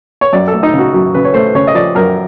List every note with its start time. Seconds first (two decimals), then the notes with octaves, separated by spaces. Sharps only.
0.21 C#5
0.33 F#2 D5
0.48 A4
0.53 A3
0.63 D#4
0.73 C#3
0.78 F#4
0.94 F#2 F#4
1.14 C#3 B4
1.25 C#5
1.34 A3 C5
1.55 C#3 C#5
1.67 D#5
1.74 F3 D5
1.95 F#2 A#4